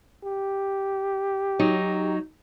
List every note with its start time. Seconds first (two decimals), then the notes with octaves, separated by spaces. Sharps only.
0.24 G4
1.59 F#3 D#4